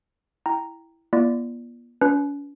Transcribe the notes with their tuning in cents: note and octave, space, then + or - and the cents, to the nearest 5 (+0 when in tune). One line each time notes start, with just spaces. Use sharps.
E4 +0 G5 +0 A#5 +0
B3 -45 F4 -45 D5 +0
C#4 +45 F4 +10 B4 +0